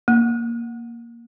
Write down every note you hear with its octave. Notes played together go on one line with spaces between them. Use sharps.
A#3